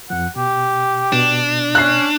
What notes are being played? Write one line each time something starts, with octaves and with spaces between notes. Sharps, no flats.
F2 F3 F#5
B2 G4
B2 D4
C#4 F#6 C7